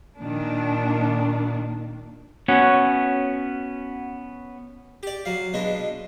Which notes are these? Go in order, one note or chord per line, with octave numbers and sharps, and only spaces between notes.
A#2 D#3 D4
B3 C#4 F#4 F#5
G4 D5
F#3 F5
B2 G#3 D4